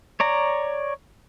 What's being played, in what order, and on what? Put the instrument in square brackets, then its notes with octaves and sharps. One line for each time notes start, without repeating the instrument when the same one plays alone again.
[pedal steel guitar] C#5 D5 A#5